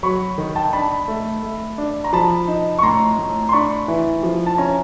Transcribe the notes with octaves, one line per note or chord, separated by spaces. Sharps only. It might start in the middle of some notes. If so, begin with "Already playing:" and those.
F#3 B5 C#6
D#3
G5 A5
D4 A5 B5
A3
A3
D4
A#5
F3 A5 B5
D#4
C#6
A2 A#5 C6
A2
C6
D4 B5 C#6
E3
F3
A5
C#4 G#5 A#5